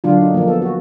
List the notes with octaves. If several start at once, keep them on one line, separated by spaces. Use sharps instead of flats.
D3 F#3 D4 F4
D#4
F3 A#3
B3 A4
F#4